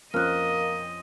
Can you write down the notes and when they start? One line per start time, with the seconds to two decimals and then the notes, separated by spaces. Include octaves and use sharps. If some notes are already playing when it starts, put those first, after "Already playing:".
0.14 F2 A#3 C4 C#4 D#5 F6 F#6